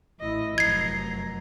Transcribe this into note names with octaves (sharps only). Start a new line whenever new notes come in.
A1 E4 D#5
F1 F#2 A#5 G#6 C7